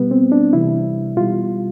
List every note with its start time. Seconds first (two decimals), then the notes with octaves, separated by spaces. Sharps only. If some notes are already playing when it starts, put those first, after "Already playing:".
Already playing: B2 G3 B3
0.11 C4
0.32 D4
0.53 C3 E3 G3 E4
1.17 B2 G3 F4